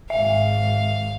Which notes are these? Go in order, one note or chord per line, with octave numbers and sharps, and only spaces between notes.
G#1 G#2 E5 F5